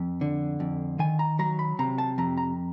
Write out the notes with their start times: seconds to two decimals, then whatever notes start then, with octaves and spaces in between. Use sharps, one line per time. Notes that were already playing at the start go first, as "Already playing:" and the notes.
Already playing: F2
0.21 D3
0.60 F2
0.99 D#3 G#5
1.19 A#5
1.39 F#3 A#5
1.59 B5
1.79 C3 A#5
1.98 A5
2.18 F2 A#5
2.38 A#5